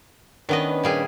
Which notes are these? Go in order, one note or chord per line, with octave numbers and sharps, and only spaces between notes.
D#3 B3 C#4 D4 B4 D#5
A#2 G3 G#4